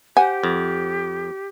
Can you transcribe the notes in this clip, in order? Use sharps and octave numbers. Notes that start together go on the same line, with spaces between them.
G4 C5 F#5 G#5
F2